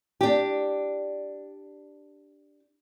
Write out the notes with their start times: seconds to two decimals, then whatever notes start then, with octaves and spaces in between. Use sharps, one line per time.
0.21 D4 G4